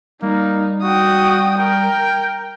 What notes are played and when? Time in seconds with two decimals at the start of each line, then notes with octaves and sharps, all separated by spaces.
0.23 G3 A#3 D#4
0.83 F#4 G5 D#6
1.59 A#4 G5